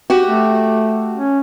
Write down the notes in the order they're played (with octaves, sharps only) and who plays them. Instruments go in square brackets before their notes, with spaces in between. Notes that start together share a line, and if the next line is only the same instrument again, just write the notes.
[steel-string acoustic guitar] F#4 G4
[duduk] A3
C#4